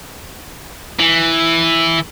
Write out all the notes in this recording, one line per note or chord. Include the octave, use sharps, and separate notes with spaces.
E3